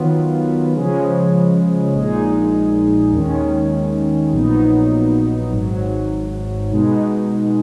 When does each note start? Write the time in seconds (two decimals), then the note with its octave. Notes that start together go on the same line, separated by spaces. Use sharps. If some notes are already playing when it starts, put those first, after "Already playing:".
Already playing: D#3 F#3 B3 F4
0.73 C#3 F3 G#3 C#4
1.93 A#1 A#2 G#3 D#4 G#4
3.12 D#2 D#3 G#3 C#4
4.32 A#1 A#2 F#3 B3 D#4
5.52 G#1 G#2 F#3
6.72 B2 G#3 D#4